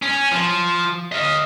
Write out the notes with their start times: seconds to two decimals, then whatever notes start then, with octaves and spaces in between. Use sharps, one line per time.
0.02 C#4
0.32 F3
1.12 D#5 F5